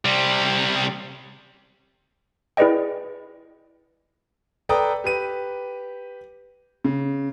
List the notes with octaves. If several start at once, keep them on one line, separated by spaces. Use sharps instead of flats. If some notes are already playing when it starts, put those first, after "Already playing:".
C3 G3
E4 G#4 B4 D5 D#5 G5
A4 B4 D5 G5 A#5 D#6
G4 B4 D#7
C#3